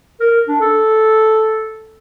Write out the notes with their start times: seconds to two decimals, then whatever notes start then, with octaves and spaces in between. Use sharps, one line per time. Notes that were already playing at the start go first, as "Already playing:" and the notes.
0.20 A#4
0.48 D4
0.60 A4